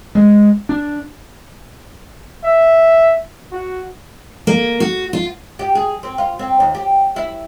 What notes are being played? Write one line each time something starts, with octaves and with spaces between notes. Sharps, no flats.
G#3
D4
E5
F#4
A#3
F#4
F4
G4
G#4
C4
F4
C4
D#2
G4
E4